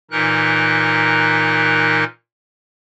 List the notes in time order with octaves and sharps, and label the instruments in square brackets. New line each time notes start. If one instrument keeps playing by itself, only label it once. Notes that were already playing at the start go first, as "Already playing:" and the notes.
[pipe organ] A#2 E3 D#4 A#4 F#6